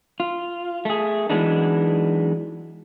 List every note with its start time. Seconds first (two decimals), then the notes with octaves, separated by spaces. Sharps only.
0.20 F4
0.85 A3 G#4
1.30 E3 F#3 G#3 B3 D4 D#4